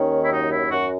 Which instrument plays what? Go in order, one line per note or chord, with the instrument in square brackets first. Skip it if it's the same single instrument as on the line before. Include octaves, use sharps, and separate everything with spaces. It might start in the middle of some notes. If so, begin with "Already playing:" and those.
Already playing: [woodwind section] D#2 D#3 C#4
E4
F#2 D#4
E4
F#2 F#4